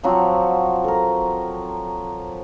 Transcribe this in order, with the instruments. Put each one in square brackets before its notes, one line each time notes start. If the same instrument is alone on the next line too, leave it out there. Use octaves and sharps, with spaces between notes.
[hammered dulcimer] F3 F#3 C4 F#4
A4 A#4